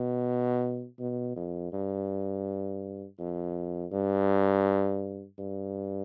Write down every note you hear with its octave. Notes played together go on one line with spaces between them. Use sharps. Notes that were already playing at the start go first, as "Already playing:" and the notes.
Already playing: B2
B2
F2
G2
F2
G2
G2